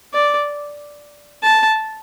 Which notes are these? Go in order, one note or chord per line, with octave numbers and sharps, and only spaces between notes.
D5
A5